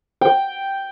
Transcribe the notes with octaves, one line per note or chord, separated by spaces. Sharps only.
G5